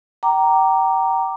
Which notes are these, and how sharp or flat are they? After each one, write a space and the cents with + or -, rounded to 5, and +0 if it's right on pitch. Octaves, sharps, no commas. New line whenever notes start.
G5 -30 A#5 +0 D6 +0